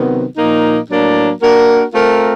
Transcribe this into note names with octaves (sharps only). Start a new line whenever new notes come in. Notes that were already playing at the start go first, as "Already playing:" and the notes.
Already playing: C3 D#3 F#3 B3
A#2 F3 A#3 D#4
A2 F#3 A#3 D4
A#3 D4 F#4 A#4
A3 C4 F4 A#4